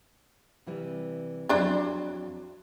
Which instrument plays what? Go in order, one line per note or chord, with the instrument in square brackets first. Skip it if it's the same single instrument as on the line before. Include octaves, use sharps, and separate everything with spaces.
[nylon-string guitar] C3 E3 G3
[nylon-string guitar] F2 F#3 [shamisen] C4 D4 E4